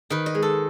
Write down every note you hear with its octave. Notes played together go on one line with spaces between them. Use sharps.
D#3 B4
D#5
G#3
A4